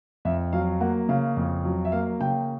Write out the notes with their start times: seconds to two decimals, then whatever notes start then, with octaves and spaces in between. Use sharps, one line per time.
0.25 F2 E5
0.53 F#3 F5
0.80 A#3 F#5
1.09 C#3 F5
1.37 F2
1.65 F#3
1.85 E5
1.92 A#3 F5
2.20 C#3 G5